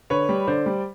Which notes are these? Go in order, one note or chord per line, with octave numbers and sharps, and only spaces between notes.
D3 B4 C#5
G3
D3 C5 D5
G3